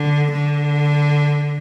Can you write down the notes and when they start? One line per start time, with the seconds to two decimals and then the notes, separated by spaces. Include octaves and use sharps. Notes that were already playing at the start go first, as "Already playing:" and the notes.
Already playing: D3
0.32 D3